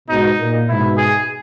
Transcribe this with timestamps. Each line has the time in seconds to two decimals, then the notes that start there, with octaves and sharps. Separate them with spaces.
0.09 G#2 B2 D#4
0.39 A#2
0.68 G#2 B2 E4
0.97 G#4